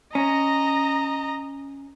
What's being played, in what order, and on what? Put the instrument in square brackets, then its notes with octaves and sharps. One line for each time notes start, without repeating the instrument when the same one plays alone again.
[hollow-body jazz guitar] C#4 [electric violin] D#5 A#5